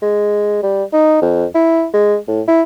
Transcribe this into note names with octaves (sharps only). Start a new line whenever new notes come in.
G#3
G3
D#4
F2
E4
G#3
A2
E4